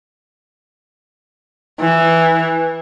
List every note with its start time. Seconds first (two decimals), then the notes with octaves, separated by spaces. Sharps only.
1.80 E3